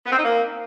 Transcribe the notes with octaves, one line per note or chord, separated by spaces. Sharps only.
B3
C4
D#4
A#3